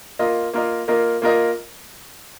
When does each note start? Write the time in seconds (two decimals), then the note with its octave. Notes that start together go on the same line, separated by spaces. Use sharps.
0.19 A#3 F4 A#4 D#5
0.54 A#3 F4 A#4 D#5
0.88 A#3 F4 A#4 D#5
1.22 A#3 F4 A#4 D#5